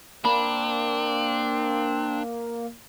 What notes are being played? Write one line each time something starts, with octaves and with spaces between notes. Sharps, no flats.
A#3 C4 D4 B5